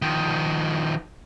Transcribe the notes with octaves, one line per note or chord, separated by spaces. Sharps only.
D#3 F3